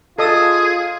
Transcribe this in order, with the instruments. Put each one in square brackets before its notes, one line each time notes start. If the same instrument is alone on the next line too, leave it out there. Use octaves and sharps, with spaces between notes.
[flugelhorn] F4 [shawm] G#4 [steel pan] A4 D#5 D#6